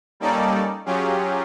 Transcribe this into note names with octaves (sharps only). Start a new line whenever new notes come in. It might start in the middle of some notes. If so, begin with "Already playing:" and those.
G3 A#3 C#4 D#4 A4 D5
F#3 C#4 F4 G4 G#4